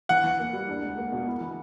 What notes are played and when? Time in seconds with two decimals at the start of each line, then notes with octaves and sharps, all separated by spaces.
0.09 E3 F#5
0.24 E3
0.39 A#3
0.53 G3
0.69 D4
0.82 C#2
0.98 A#3
1.12 B2
1.27 E4
1.41 E3